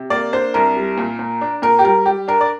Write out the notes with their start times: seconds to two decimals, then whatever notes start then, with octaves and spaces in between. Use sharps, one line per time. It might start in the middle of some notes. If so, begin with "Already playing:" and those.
Already playing: C3
0.10 A#3 D5
0.33 D4 C5
0.54 C2 A#4
0.77 G3
0.98 A#2
1.19 A#2
1.41 D4
1.62 A#2 A#4
1.79 G4
1.85 G3 A#4
2.06 G3 G4
2.28 D4 A#4
2.41 D5